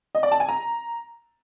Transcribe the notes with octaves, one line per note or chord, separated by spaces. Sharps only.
D#5
D5
A5
G#5
A#5